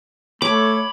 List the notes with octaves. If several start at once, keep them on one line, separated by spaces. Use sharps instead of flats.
A3 C#5 B5 D6